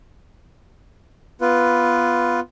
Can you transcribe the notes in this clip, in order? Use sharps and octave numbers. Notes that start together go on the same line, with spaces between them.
B3 F4 B4